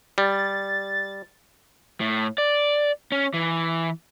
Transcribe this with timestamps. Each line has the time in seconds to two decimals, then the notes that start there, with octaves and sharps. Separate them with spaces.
0.18 G3 A6
2.00 A2
2.38 D5
3.12 C#4
3.34 E3